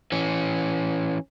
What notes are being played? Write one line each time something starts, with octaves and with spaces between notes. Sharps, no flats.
E3 C#4